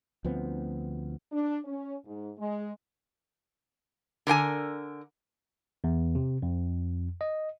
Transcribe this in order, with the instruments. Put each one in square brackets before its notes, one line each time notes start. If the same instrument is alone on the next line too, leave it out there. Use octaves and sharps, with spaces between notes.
[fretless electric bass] D2 F3 B3 C4
[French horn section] D4
C#4
G#2
G#3
[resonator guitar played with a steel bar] D3 A#4 G5 G#5
[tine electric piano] E2
C3
F2
D#5